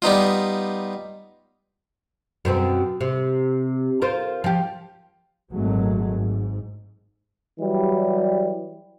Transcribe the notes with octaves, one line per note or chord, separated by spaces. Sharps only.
G3 B3 D#4 F4
F#2 B2 C4
C3
F4 A#4 C5
F3 G4
G#1 A#2 F#3 G#3 A3
G#2
E3 F#3 G3